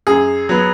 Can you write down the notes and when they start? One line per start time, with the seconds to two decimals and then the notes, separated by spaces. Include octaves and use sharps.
0.07 F#2 G#4
0.49 F#3 B3